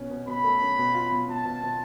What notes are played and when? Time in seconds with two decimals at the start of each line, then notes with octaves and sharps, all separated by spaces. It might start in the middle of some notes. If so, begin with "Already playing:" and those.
Already playing: B2 C#4
0.10 B2
0.27 B2 B5
0.44 A3
0.61 C#4
0.78 B2
0.94 F4
1.11 B2
1.28 B2 A5
1.45 B2
1.63 B2